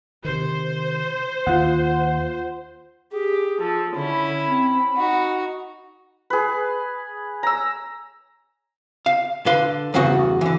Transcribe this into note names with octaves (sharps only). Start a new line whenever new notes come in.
C3 D#3 C5
D#2 F4 F#5
G4 G#4
F3 A4
D3 C#4 E4 B5
C4
D#4 F#4 F#5
G#4 B4
A#5 E6
F5
D3 B4 F5 C6
E2 G2 C#3 B3 F#4
D3 E3